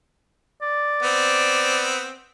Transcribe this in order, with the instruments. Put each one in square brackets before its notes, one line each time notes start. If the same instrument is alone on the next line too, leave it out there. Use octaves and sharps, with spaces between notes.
[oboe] D5
[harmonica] B3 C4